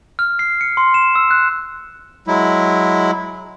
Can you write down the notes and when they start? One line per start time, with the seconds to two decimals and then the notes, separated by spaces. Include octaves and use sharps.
0.19 F6
0.39 C7
0.61 C#7
0.77 C6
0.94 E7
1.15 E6
1.31 F#6
2.27 F#3 G#3 E4